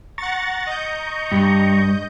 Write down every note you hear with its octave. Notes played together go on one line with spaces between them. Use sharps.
F#5 A#5 C#6 A6
D#5 G6
G2